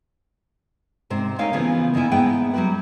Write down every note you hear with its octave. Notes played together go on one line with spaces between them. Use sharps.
G#2 C3 C5
A3 C#4 D#4 A#4 C#5 F5
C#3 E3 F3 B3
D#2 D#3 D#4 E4 G#5
G#2 B3 G#4 B4 E5 G5
F#3 G3 F#4 G4 B4